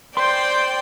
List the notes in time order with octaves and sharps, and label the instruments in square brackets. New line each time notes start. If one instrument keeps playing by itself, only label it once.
[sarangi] C5 [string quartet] D5 G5 [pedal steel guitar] C6